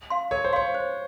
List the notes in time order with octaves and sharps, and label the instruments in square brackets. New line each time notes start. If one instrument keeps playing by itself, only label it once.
[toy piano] F5 C6
[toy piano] A#4 [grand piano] C#5
[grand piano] C5
[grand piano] C#5 [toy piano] F5 C6
[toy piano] C5